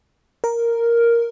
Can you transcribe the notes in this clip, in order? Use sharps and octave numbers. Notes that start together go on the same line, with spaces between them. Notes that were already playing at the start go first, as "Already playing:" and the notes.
A#4